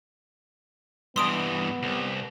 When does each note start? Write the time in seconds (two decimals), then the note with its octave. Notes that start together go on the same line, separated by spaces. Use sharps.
1.16 G2 E3 B3 C6 D#6 D7
1.83 C2